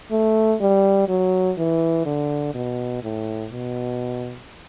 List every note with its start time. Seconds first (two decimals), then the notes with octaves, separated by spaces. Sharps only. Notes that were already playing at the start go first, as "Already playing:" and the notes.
0.11 A3
0.61 G3
1.08 F#3
1.58 E3
2.06 D3
2.54 B2
3.03 A2
3.52 B2